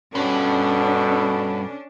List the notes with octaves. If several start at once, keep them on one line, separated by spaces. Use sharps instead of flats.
G2 B2 C#4 D4 F#4 A4